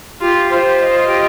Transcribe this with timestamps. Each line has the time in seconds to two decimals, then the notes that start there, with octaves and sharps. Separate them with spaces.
0.21 F4 G4
0.50 F4 C5
0.79 D#5
1.09 G4